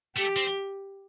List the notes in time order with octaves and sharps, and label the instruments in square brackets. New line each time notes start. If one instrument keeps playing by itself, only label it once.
[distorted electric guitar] A3 [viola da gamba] G4
[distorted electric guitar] C4